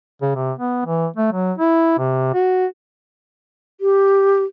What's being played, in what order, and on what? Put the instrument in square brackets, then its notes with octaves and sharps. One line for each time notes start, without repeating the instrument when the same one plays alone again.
[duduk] C#3
C3
B3
E3
A3
F#3
E4
C3
F#4
[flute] G4